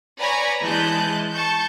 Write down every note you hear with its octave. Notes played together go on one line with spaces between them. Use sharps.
B4 C#5 D5 G#5 A#5 B5
E3 G#3 A5 F#6 G6
A5 C#6 G6